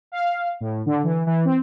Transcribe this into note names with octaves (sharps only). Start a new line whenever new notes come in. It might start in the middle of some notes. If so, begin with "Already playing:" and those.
F5
A2
D3
E3
E3
C4